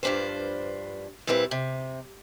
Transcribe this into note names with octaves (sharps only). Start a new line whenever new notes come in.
G2 F3 D4 B4 C5
A#2 G3 C4 E4 A#4 B4
C3